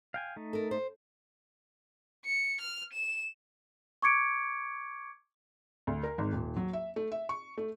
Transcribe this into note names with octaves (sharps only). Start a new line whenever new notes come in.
F5 G5 G#5
A3 D#4
A4 A#4
C5
C#7
F6
E7
C#6 D6 G#6 C#7 D7
D2
A#4
G#1
D#1
F#3
E5
A3
E5
C#6
A3